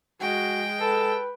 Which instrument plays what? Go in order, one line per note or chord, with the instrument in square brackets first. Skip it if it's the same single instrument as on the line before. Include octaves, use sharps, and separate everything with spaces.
[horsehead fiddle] G#3 [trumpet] F#4 [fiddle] G5
[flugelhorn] A4 [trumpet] B4